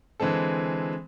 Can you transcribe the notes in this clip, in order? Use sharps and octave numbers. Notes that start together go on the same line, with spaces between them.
D3 E3 G#3 C4 A4